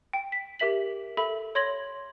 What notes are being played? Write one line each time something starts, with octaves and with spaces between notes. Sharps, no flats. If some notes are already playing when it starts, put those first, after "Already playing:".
G5
B6
G4 A#4 E5 B6 F#7
A4 E5 B5
C#5 C6 G#6 A#6 F#7